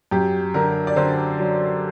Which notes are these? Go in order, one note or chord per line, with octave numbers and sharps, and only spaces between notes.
F#2 G4
D3 A#4
D5
D3 C5
F#3